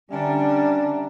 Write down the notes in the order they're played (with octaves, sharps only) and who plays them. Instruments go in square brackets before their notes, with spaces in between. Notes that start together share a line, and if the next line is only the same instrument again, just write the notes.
[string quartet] D3 D4 [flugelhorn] G3 [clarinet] C#4 [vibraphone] E5 A5 A#5